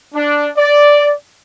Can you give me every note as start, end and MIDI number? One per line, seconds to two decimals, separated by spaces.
0.15 0.49 62
0.57 1.13 74